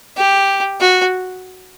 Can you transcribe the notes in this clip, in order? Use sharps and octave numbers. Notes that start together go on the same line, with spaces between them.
G4
F#4